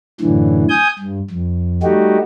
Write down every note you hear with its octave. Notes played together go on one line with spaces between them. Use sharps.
F#2 A2 D3 E3
G#5 D#6 G6
G2
F2
G3 A3 D#4 F#4 G4